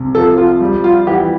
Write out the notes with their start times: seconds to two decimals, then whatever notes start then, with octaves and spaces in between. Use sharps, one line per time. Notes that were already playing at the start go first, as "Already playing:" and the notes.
Already playing: C2 C3
0.15 F3 A4
0.38 F4
0.61 G3
0.84 F4
1.07 E3 G4